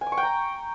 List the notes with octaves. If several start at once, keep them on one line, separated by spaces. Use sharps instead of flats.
G#5
D6
C#6
G5
A#5